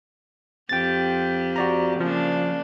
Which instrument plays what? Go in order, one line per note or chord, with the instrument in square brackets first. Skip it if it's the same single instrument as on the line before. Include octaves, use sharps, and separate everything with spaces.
[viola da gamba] F2 G4 [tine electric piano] G5 A6
[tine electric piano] F#4 D5 A#5
[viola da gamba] C#3 A#3 D4 [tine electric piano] F3